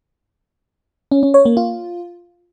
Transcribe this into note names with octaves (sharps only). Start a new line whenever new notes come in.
C#4
C#4
C#5
A#3
F4